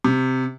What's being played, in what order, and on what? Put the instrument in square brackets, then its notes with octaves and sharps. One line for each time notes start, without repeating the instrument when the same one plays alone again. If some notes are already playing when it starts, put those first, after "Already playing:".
[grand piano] C3